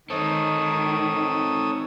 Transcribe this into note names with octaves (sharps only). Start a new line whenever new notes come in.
D#3 C4 D#4 A4 C#5 D#6